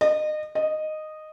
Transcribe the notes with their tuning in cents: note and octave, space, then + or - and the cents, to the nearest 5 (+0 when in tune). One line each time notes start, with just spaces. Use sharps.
D#5 -30
D#5 -10